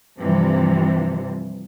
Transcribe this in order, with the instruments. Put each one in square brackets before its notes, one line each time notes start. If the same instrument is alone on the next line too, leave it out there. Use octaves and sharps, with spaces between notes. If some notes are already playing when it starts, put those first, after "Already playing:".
[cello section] G2 C3 E3 F3